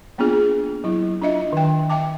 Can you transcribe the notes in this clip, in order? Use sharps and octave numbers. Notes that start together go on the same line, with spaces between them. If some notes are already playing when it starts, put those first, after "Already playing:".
A#3 B3 D4 F4 G#4
F#3 E4
D4 F4 D#5 E5
D#3 G5
E5 G5 A5 D6